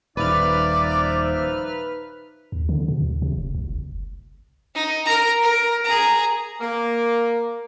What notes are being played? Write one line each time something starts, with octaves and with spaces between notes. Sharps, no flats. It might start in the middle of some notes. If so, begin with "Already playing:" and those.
D#1 F3 D#4 B4 D5 E5 F6
D#2
D3
B2
D2
C3
E1
C2
F#1
D#4
A#4 A#5
A#4
G#4 A#5
A#3